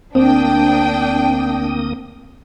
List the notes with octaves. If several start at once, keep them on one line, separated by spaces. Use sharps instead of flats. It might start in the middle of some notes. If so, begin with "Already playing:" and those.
D2 A#3 C4 D4 G5 D#6